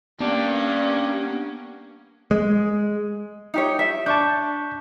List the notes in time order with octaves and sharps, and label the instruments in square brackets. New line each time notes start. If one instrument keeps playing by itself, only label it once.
[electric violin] A#3 C#4 [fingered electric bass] B3 [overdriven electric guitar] D4 G4
[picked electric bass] G#3
[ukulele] D#4 G4 C#5
E5
[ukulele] D4 [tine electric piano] A5 C#6 G6